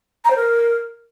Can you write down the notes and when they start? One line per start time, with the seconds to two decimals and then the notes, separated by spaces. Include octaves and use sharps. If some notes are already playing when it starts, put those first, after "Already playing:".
0.25 A#5
0.30 C5
0.36 A#4